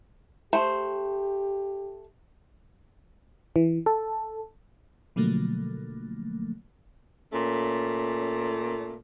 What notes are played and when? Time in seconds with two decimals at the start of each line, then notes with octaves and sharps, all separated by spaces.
0.53 A3 G4 C5
3.56 E3
3.86 A4
5.16 B2 D3 F3 F#3 A3 A#3
7.32 A#2 A3 C#4